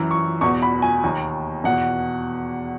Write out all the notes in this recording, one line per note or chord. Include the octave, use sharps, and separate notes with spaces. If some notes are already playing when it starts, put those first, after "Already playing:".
Already playing: F#2 E3
C#6
E2 B2 C#6
B5
G#5
D#2 D#3
E2 B2 F#5